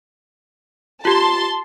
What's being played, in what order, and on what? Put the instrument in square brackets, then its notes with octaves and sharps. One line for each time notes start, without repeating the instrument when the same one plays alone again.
[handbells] F4 G4 [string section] A5 C6